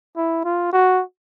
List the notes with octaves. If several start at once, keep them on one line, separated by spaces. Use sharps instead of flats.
E4
F4
F#4